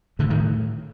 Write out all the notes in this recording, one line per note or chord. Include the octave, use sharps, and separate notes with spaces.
A2 D3
D#3